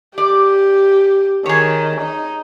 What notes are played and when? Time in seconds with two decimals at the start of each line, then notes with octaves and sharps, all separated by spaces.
0.18 G4 D5
1.46 D#3 G#4 C#5
2.02 D#4